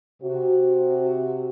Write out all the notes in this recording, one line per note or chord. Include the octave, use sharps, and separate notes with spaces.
C3 F#4